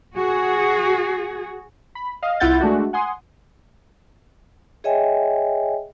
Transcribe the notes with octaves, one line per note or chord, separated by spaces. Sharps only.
F#4 G#4
B5
D#5 F5
C2 E4 F4 F#5 G6 A6
G#3 A3 D4 F#4
F#5 G#5 C6 D#6
G#4 C#5 D#5 E5 G5 G#5